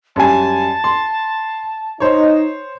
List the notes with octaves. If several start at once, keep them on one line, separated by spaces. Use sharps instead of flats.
F#2 G3 G#5 A5
C6
D#4 C5 C#5